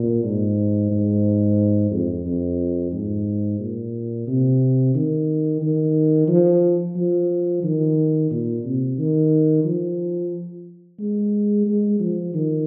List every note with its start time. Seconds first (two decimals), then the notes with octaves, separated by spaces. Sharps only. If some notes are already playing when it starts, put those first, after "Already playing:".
Already playing: A#2
0.24 G#2
0.91 G#2
1.91 F2
2.26 F2
2.92 G#2
3.59 A#2
4.27 C3
4.95 D#3
5.62 D#3
6.28 F3
6.96 F3
7.64 D#3
8.31 A#2
8.64 C3
8.98 D#3
9.65 F3
10.99 G#3
11.67 G#3
12.00 F3
12.34 D#3